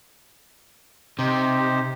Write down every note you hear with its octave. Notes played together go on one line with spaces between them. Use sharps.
C3 D#4 G4 C5